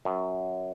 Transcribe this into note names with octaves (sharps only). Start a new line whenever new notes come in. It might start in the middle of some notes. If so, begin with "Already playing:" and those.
F#2